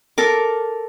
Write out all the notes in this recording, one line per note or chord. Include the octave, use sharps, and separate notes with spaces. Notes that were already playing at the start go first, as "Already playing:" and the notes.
A4 A#4 D6